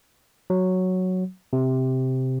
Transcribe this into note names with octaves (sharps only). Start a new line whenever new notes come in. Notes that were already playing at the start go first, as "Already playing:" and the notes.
F#3
C3